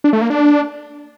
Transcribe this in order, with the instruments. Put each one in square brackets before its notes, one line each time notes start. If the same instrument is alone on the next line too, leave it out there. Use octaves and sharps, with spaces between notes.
[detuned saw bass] D4
A3
A#3
D4